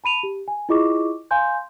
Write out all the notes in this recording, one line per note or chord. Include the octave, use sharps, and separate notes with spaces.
A5 B5 D#7 F7
G4
G#5
E4 F4 G#4 D#5 C#6 D6
F5 G#5 C6 G6